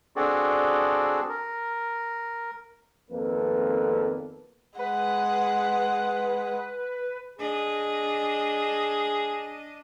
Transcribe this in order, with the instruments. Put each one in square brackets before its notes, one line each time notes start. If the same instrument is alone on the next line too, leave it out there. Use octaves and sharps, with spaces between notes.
[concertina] C4 D4 F#4 G#4 A4 D5
A#4
[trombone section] G#1 F2 A#3 B3 A4 B4
[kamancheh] G#3 F#5 [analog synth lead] B4
[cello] D4 D#5 [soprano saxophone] G#4